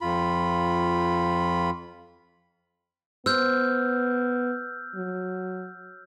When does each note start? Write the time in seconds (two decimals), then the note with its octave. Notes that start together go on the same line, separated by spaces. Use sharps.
0.01 F2 F4 B5
3.26 B3 C5 E6 F6 G6
4.95 F#3